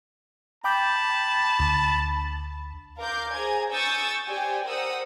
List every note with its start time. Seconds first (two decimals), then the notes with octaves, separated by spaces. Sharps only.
0.64 G5 A5 B5 D6 G6
1.59 D2
3.00 A#4 F5 C6 D6 G6
3.32 G#4 C5 G#5 A#5 G#6
3.70 G#5 C#6 D#6 E6 G6 A6
4.27 G4 C5 D5 G5 G#5
4.66 A#4 C5 F#5 D#6 E6